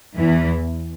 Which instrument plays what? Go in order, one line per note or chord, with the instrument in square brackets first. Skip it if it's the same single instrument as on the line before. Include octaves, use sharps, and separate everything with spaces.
[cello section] E2 E3